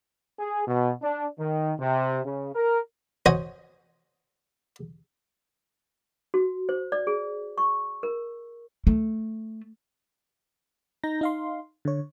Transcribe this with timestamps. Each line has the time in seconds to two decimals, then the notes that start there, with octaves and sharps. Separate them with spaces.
0.39 G#4
0.67 B2
1.02 D4
1.38 D#3
1.79 C3
2.25 C#3
2.55 A#4
3.26 C#4 F#4 C5 C#5 D#5
6.34 F#4
6.69 C5
6.92 D5
7.07 G#4
7.58 C#6
8.03 A#4
8.87 A3
11.03 D#4 A#5 G6 A#6
11.21 D#4 F5 C6
11.85 D3 C#5